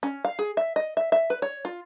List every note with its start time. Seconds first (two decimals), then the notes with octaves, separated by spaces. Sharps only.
0.03 C#4
0.25 F5
0.39 G#4
0.57 E5
0.76 D#5
0.97 E5
1.12 E5
1.30 B4
1.42 C#5
1.65 F4